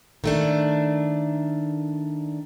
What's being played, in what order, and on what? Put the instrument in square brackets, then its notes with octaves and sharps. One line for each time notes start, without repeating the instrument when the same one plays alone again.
[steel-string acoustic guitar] D#3 A3 D4